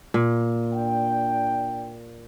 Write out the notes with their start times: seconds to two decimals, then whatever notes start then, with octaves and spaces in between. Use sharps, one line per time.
0.14 A#2
0.74 D4 G5